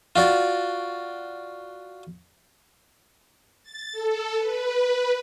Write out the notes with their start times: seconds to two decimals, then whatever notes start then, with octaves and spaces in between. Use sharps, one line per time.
0.16 F4 F#4 D5
3.63 A6
3.92 A4
4.38 B4